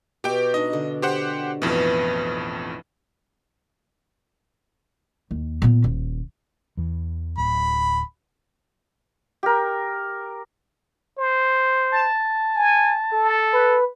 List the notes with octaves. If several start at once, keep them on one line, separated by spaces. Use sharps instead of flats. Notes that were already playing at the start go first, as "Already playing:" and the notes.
B2 G4 E5 G5 D6
D4 D#4 D#5
D3
G4 C5 F#5
A1 F2 B2 E3 D4 B5
D#2
A#2 B3
D#1
E2 E3
D1 B5
G4 A#4
C5
A5
G#5
A4
B4